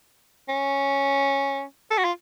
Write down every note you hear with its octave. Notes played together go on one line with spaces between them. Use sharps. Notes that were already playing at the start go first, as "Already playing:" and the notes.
C#4
A4
F#4
F4